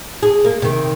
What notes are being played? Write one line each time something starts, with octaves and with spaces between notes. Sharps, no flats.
G#4
A#3
C3 D#3